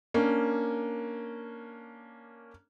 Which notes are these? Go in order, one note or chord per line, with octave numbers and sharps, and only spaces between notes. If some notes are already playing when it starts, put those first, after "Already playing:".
A#3 C#4 D4